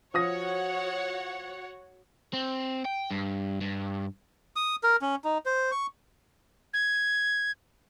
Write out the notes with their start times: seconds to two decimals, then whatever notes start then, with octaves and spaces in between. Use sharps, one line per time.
0.14 F3 F#4 C#5 F#5 D#6 A#6
2.33 C4
2.85 G5
3.11 G2
3.61 G2
4.56 D#6
4.83 A#4
5.02 C#4
5.25 D#4
5.46 C5
5.71 C#6
6.74 G#6